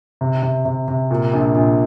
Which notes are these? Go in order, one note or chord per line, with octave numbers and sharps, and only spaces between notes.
C3
C3
C3
C3
A#2
A#1
A#1